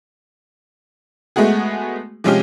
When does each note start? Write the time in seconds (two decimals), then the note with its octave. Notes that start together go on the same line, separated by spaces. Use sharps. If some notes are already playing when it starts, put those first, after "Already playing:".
1.36 G#3 A3 B3 F#4 G#4
2.24 C3 F3 G#3 C#4 F4 G4